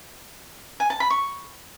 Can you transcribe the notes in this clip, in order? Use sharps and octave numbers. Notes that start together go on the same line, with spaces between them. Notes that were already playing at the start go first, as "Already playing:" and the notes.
G#5
A5
B5
C#6